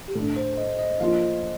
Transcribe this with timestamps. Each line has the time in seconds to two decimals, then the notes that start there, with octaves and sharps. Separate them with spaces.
0.08 G4
0.15 A2 A3 D4 A4
0.36 C5
0.58 D#5
0.79 D#5
1.00 F3 A#3 F4 F5